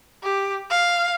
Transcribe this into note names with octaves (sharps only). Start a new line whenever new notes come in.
G4
F5